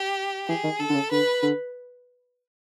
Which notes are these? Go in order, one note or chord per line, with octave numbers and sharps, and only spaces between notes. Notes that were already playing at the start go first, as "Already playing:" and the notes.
Already playing: G4
E3 G#4
D#3
D3 A4
D3
C#3
D3 B4
D3